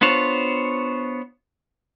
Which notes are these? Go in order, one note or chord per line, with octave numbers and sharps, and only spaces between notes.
B3 D4 F4 C5 C#5